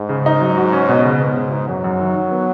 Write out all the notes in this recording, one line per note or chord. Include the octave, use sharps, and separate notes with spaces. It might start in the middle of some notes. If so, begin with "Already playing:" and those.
Already playing: G#2
C#3
D#4
F#3
F#4
C#4
B2
G#2 C#3
B3
C#3
D#4
F#2 F#3
F#2
D#3
D#3
B3